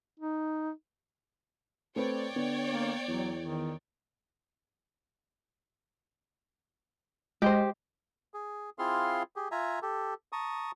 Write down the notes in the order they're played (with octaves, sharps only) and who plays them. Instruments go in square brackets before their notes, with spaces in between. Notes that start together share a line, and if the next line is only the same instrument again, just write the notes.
[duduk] D#4
[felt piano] A3 C4 B4 [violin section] C#5 D5 G5
[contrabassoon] D3 [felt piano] B3
[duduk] A#3
[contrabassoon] E2 [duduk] F#3
[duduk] D#3
[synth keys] G#3 D#5 [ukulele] G4 C5
[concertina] G#4
C4 E4 F4 G#4 F5 C6
G4 G#4
F4 E5 G#5 A#5
G4 A4
A5 A#5 C#6 D#6